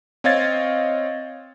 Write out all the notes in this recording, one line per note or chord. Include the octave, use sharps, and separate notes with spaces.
C4 C#5 D#5 F5 G#6 A6